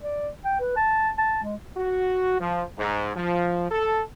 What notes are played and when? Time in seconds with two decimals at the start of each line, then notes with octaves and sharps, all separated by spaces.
0.02 D5
0.45 G5
0.60 B4
0.76 A5
1.18 A5
1.43 G#3
1.76 F#4
2.40 F3
2.78 G#2
3.16 F3
3.71 A4